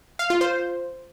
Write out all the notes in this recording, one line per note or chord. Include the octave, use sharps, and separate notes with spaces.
F5
F4
C5